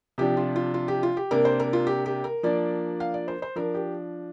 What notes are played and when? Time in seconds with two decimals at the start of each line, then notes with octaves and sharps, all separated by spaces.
0.18 C3 F3 D4 G4
0.37 F4
0.56 F4
0.74 F4
0.88 G4
1.03 F4
1.17 G4
1.31 C3 A#3 D4 A#4
1.45 C5
1.60 A#4
1.73 F4
1.87 G4
2.06 G4
2.24 A#4
2.43 F3 A#3 D4 D5
3.00 F5
3.14 D5
3.28 C5
3.42 C5
3.56 F3 D4 A#4
3.75 G4